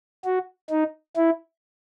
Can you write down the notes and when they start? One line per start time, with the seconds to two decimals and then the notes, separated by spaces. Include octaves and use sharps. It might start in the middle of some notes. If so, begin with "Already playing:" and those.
0.25 F#4
0.70 D#4
1.16 E4